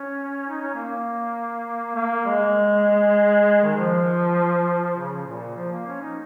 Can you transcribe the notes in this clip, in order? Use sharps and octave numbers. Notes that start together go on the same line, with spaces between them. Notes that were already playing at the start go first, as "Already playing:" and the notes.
Already playing: C#4
D#4
C#4
A#3
A#3
G#3
D#3
F3
C#3
A#2
F3
A#3
C#4
D#4